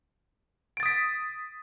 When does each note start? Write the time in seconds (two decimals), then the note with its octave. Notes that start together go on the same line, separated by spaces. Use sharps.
0.77 D7
0.80 A6
0.83 D#6
0.86 B6